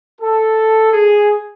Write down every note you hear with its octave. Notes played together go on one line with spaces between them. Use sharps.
A4
G#4